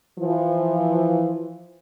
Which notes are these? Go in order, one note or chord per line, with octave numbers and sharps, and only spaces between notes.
E3 F3